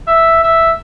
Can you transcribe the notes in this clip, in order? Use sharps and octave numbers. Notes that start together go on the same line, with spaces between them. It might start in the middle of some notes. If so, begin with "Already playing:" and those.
E5
E5